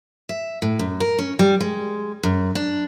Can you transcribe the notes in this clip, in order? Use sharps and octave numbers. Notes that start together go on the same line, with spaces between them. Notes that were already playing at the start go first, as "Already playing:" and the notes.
E5
A2
F#2
A#4
C#4
G3
G#3
F#2
D4